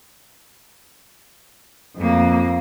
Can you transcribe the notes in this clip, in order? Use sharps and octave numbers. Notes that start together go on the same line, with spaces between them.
F2 A#3